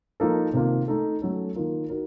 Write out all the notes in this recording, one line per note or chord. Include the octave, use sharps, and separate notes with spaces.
F3 A#3 D#4 A4
C3 D#3 A#3 F4
A3 D#4 A4
F#3 A3 C#4 A4
D#3 A#3 F4 A#4
D#4 F#4 A#4